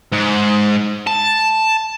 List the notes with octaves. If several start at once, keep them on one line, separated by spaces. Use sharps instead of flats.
G#2
A5